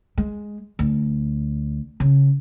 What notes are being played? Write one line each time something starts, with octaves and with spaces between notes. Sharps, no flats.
G#3
D2
C#3